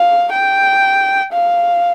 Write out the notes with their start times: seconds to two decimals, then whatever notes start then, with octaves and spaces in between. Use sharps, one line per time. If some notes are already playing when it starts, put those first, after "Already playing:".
Already playing: F5
0.33 G5
1.33 F5